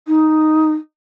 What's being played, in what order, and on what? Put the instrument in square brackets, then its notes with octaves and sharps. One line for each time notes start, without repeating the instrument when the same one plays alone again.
[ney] D#4